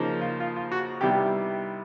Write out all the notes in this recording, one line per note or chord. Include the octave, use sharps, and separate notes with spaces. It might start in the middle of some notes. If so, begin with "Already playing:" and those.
Already playing: C#3 F3 A#3 D#4
F4
F4
F4
F#4
C3 D#3 G3 B3 E4 G4